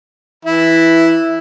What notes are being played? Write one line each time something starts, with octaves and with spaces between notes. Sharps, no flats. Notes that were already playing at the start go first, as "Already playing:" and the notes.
E3 E4